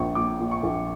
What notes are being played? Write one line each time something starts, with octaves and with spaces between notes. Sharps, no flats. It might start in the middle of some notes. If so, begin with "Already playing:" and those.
Already playing: A#1 A#2 A#3 C#6
A#2 D6
A#2
C#6
A#1